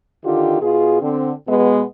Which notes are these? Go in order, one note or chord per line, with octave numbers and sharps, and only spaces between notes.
D3 D#3 F4 G4
B2 F4 G#4
D3 C4
B2 G#3 B3